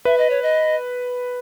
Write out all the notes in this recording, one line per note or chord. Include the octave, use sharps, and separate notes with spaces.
B4 E5
D#5
C#5
D#5